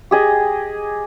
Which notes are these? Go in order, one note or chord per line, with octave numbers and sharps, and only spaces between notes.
G4 G#4 D#5